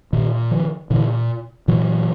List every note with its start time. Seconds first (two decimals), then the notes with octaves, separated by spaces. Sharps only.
0.13 A#2 D#3
0.51 D#3 F3
0.90 A#2 D3 E3
1.68 A#2 E3 F#3